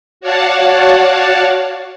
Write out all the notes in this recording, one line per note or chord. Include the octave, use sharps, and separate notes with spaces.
F#4 C#5 D5 F5 F#5 A5